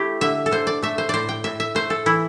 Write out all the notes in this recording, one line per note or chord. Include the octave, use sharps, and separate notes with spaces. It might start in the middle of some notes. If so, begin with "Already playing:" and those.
Already playing: A3 E4 G4
D3 E5
A4
D3 C5
D5
A3 E5
C5
A2 C5 D5
G5
A2 E5
E5
A3 C5
A4
E3 E4